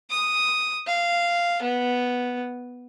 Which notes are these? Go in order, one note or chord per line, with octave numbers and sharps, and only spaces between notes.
D#6
F5
B3